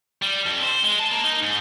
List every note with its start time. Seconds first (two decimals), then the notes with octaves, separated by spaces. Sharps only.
0.22 G3
0.46 F2
0.63 C5
0.84 G#3
0.99 A5
1.11 A#3
1.24 D#4
1.42 G#2